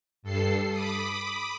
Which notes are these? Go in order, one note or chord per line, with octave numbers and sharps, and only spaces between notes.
G2 A4 C7
B5 D6 D#6